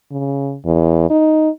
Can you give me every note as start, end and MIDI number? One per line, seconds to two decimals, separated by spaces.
0.12 0.57 49
0.65 1.08 40
1.10 1.49 63